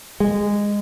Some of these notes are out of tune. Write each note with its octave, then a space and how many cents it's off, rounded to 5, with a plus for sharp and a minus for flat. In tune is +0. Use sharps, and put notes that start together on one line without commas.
G#3 -15